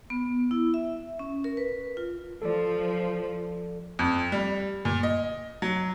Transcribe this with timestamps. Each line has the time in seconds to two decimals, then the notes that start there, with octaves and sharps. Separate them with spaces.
0.10 B3
0.51 E4
0.74 E5
1.19 C#4
1.44 A#4
1.57 B4
1.97 F4
2.42 F3 A4 D5
3.99 F2
4.32 G3
4.85 A#2
5.03 D#5
5.62 F#3